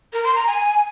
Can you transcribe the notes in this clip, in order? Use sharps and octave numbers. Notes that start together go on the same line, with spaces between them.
A#4
C6
A#5
G#5